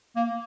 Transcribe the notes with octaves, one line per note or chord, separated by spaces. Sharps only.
A#3